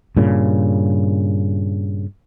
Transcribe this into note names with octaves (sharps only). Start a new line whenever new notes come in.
G2 A#2 C#3